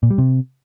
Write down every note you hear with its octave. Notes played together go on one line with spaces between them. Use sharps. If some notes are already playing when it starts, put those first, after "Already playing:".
A#2
G3
C3